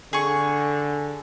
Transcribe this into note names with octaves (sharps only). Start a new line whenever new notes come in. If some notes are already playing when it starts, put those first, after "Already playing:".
D3 G#4 C#6